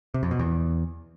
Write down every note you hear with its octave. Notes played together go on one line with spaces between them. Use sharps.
C3
F2
B2
E2